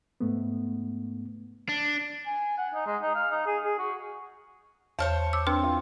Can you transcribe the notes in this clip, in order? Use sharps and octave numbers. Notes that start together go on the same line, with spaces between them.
G#2 A3 B3
D4
G#5
F#5
D#4
G#3
D#4
F5
D#4
G#4
G#4
F#4
E2 C5 C#5 A5 F6
D6 E6
C4 D4 B4 F6
F4 C5